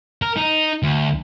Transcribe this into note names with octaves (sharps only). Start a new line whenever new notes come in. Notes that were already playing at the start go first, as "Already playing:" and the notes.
A#4
D#4
D2